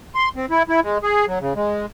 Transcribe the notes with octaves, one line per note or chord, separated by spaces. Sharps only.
C6
C4
E4
E4
G#3
G#4
F#3
C#3
G#3